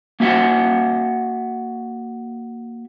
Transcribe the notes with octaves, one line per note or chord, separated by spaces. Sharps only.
A#3 F#4 E5 F#5